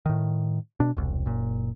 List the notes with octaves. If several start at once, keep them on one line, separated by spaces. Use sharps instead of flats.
A2 D#3
B2 D4
E1 C2
F#1 A#2